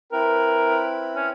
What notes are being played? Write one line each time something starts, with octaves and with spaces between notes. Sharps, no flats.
C4 E4 A#4 B4
C#4